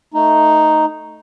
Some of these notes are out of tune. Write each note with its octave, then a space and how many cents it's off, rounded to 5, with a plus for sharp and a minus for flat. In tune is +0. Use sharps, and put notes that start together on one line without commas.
A3 +0 D#4 +0